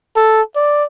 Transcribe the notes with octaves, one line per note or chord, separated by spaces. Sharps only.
A4
D5